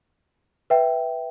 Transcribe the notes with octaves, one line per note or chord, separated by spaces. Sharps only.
B4 E5 G5